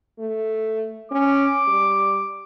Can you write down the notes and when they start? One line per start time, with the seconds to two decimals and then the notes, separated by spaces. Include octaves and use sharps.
0.19 A3
1.12 C#4 D6
1.67 G3